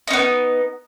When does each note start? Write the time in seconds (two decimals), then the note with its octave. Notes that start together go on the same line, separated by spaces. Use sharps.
0.08 D#4
0.10 C#4
0.13 B3